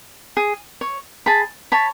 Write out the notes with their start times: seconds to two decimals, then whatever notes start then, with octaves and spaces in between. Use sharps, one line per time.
0.37 G#4
0.81 C#5
1.26 G#4 A5 B5
1.72 C#5 A5 B5